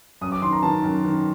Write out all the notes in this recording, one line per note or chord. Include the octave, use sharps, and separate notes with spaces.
F#2 D#6
D6
D#3 C6
A#5
D#3 A5
F#2
D#3